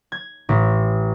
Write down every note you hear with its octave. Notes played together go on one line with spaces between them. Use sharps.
G#6
A1